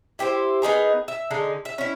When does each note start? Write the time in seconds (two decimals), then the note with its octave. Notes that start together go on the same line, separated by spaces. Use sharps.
0.19 E4 G4 B4 C5
0.62 B3 D#4 G#4 A#4
1.08 E5
1.31 D3 G#3 D#4
1.65 E5
1.78 C#4 E4